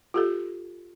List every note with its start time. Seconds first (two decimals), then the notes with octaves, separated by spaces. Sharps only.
0.14 F4 G4 A4